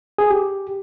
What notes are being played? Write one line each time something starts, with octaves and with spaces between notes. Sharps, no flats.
G#4
G4